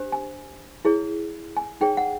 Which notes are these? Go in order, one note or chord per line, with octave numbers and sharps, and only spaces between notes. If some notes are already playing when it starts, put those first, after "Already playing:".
Already playing: D4 G4 C5
G#5
E4 G#4 C#5
G#5
D#4 G#4 C#5 G5
F#5